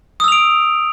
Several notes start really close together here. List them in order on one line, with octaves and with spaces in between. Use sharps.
D#6 E6 F7 D7